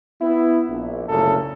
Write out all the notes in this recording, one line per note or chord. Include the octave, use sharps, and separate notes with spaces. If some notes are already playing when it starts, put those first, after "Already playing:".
B3 E4
A#1
F#1 C2 A#2 C#3 A3 A4